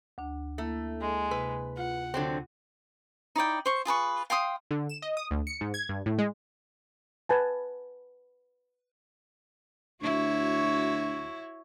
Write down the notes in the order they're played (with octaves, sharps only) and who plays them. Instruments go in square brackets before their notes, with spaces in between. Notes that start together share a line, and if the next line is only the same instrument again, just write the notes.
[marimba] D2 D4
[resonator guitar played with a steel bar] A3 [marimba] A#3 E4
[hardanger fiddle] G#3
[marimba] C3 [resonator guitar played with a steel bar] B4
[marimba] F4 [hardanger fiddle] F#5
[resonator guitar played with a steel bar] D3 F#3 C4
[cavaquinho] D#4 E4 D5 G5
C5 C#6
F4 G#4 B4 C#6
F5 G5 C6 D#6
[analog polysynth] D3
E7
D#5
D#6
D2
C#7
G#2
G#6
G2
A2
G#3
[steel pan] B4 G#5 A5
[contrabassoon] D2 [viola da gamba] E4 F#4 C#5